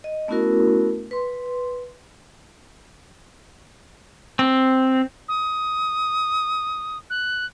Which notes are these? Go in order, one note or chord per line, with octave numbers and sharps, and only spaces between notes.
D#5
A3 B3 C#4 E4 F#4 A#4
B4 C6
C4
D#6
F#6